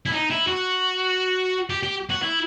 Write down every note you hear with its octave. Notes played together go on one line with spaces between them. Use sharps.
E4
D#4
E4
F#4
G4
G4
F#4
E4